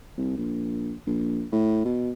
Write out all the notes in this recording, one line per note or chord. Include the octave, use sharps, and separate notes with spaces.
C2
A#1
A#1
A2
B2